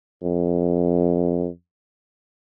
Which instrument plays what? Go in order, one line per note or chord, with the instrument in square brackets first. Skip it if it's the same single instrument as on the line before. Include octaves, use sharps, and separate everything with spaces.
[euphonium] F2